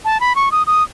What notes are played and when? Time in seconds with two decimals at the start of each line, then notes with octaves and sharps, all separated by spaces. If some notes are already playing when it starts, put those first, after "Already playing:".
0.05 A5
0.20 B5
0.36 C#6
0.52 D#6
0.67 D#6